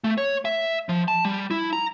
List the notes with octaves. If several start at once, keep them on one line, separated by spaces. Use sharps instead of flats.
A3
C#5
E5
F3
A5
G3
E4
A#5